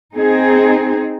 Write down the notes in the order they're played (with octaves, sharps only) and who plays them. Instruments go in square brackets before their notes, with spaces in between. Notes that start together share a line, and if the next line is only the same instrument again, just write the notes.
[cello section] C4 D#4 G#4